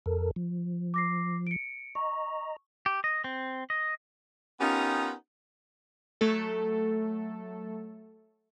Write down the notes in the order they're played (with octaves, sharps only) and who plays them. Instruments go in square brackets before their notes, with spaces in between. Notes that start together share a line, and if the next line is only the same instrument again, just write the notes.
[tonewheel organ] F2 A4 A#4
F3
[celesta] D6 A#6 C7
C#7 D7
[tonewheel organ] D#5 A#5 [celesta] C#6
[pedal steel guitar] G4
D#5
C4
D#5
[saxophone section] B3 C#4 D#4 F4 G4 A#4
[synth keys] F#3 A3 A4